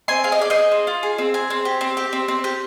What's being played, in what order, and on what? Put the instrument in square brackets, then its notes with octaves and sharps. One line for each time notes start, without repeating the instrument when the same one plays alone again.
[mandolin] C4 G#5 C6
G#4 F5
D#5
G#4 D5
C5 D#5
G#4
C4
F4
G#4
C4
G#4
C4
G4
C4
G4
C4
C4
G4